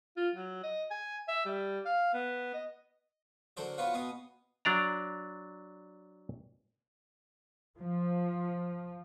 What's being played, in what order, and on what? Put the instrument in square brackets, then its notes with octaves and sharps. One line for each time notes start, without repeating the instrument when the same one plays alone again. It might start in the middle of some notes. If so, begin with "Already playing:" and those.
[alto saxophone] F4
F#3
D#5
G#5
E5
G3
F5
B3
D#5
[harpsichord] D3 F#3 A4 A#4 C5 D5
B3 F4 F#4 B4 C#5 F5
B2 B3 F5 G#5 D#6
[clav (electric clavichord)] F#3 D4 D5 A#5
[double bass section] F3